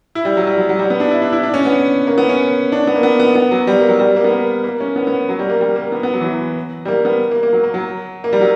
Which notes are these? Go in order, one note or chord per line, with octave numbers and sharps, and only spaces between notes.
E4
G3
F#3
G3
F#3
F#3
G3
B3
D4
E4
D4
E4
D4
C#4
B3
A#3
B3
C#4
D4
B3
A#3
B3
B3
B3
F#3
G3
A#3
F#3
G3
A#3
B3
A#3
A#3
C#4
B3
B3
F#3
G3
A#3
G3
A#3
B3
B3
F#3
E3
F#3
G3
A#3
B3
A#3
A#3
F#3
A#3
F#3
A#3
G3
F#3